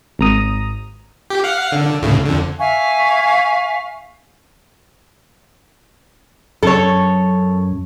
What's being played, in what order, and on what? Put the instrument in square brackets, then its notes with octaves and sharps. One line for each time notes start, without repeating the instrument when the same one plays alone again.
[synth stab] G#1 A#5 D#6
[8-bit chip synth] G4
F5 F#5
D3
D2 A2 C#3
F2 D3
[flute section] E5 F5 G#5 C#6
[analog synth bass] F#2 [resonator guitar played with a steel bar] A4 C#5